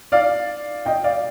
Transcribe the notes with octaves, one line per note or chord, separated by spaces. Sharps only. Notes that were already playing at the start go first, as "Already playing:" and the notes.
D5 F5
D#5 G5
D5 F5